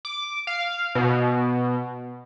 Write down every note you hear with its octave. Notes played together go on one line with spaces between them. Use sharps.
D6
F5
B2